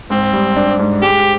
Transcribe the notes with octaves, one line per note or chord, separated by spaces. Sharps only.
G#2 C4
G3
D4
G#2
G#3 G4